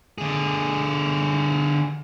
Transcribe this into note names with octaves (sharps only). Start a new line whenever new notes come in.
D3 G#4